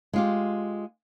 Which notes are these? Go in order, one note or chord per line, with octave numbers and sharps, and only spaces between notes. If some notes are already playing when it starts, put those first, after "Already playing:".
G#3 F4 G4